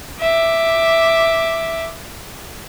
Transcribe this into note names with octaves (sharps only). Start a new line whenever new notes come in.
E5 D6